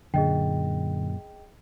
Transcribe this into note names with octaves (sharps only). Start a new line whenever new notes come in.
F#2 A#2 D3 G#4 D#5 G5